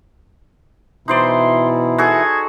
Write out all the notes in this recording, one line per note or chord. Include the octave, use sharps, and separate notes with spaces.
B2 E3 D#4 E4 C5 D5 C6
F#4 G#4 A4 G#6